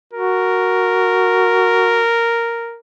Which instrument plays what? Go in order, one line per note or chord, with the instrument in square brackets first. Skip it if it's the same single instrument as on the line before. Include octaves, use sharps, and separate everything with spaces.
[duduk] F#4 [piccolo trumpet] A#4